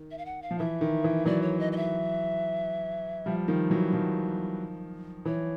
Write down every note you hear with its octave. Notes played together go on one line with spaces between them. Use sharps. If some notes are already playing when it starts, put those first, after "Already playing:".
Already playing: D#3
E5
F5
F#5
F5
F3
E3 E5
D#3
E3
E3 F#3 D5
C#5
D#5
D#5
E5
F3 G3
D#3 F3
E3 F#3
D#3 F3
E3 C#5